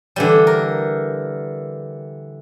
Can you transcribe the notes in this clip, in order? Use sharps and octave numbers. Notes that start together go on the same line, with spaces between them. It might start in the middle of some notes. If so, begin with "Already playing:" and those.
D3 E3 G3
A#4